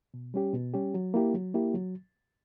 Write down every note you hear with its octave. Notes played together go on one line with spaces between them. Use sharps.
B2
G3 C#4 G4
B2
G3 C#4 G4
F#3
A#3 E4 G4
F#3
A#3 E4 G4
F#3